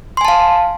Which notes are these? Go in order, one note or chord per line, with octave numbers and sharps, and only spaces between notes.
F5 G#5 A5 C6